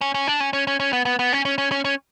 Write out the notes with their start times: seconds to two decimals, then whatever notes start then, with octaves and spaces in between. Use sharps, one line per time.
0.01 C#4
0.15 C#4
0.27 D4
0.40 C#4
0.53 C#4
0.67 C#4
0.80 C#4
0.93 B3
1.05 B3
1.19 B3
1.33 C#4
1.45 C#4
1.58 C#4
1.71 C#4
1.85 C#4